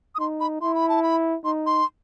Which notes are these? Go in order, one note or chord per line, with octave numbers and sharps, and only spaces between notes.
D#6
D#4 C6
B5
E4 C6
B5
A5
B5
D#4 C6
C6